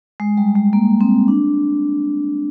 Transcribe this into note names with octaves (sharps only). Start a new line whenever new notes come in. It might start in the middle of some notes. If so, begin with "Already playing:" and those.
G#3
G3
G#3
A#3
C4
D4